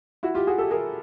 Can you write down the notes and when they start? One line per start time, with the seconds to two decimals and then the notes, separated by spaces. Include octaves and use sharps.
0.23 E4 F#4
0.35 F4 G4
0.47 F#4 G#4
0.58 G4 A4
0.71 G#4 A#4